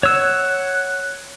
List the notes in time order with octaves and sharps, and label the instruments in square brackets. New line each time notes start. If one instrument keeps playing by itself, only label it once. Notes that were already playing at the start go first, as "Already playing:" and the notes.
[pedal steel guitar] C#5 E6 [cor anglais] F#5